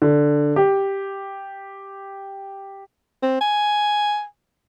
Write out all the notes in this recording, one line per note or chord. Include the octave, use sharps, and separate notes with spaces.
D3
G4
C4
G#5